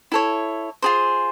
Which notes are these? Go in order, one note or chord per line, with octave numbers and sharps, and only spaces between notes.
E4 A4 C#5
F4 G#4 C5